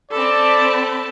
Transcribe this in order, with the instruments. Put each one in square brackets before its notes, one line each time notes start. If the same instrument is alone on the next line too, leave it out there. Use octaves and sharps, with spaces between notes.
[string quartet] C4 B5 [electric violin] A4 A5 [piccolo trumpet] D5